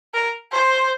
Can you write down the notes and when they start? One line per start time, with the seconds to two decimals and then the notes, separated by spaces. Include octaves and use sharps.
0.14 A#4
0.52 C5